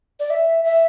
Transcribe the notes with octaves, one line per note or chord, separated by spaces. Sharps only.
D5
E5
E5